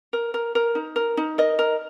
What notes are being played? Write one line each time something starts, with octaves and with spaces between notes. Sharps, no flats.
A#4
A#4
A#4
D#4
A#4
D#4
A#4 D#5
A#4